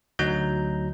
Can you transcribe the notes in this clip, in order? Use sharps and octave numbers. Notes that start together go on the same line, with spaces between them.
D2 F#3 D#4 A#5 G6